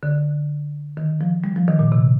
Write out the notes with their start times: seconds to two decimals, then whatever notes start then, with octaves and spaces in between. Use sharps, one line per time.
0.03 D3
0.97 D#3
1.21 F3
1.44 G3
1.56 F3
1.68 D#3
1.79 A#2
1.92 C3